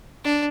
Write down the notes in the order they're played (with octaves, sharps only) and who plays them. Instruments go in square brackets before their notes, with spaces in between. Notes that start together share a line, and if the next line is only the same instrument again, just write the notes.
[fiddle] D4